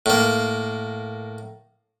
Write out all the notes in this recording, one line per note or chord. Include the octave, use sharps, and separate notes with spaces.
A2 A#3